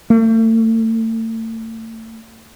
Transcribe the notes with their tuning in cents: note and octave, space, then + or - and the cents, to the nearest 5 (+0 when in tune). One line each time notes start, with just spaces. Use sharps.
A3 +40